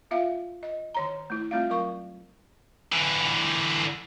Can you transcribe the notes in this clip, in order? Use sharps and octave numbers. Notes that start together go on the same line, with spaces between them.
B3 F4 E5 F5
D#5
D#3 C#5 A#5
A3 E4
G3 A3 C4 F4 D5 F5
F#3 A#4 F5 C#6
D3 E3